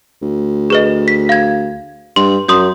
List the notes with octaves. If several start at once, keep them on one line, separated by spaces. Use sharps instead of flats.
D2
G#4 B4 D#5
B6
F5 G#6
G2 C6
F#2 C6 D#6 G6